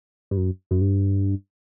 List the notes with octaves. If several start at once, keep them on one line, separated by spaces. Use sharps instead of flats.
G2
F#2
F#2
G2